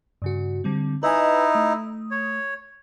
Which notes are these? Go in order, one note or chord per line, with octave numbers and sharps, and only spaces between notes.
G2 C#3 F#4
D3 G3 C4
D#4 E4 B4 D#5 G#5
A3 D#6
C#5